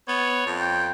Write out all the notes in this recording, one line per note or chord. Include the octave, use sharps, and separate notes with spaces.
B3 C#5
F2
G5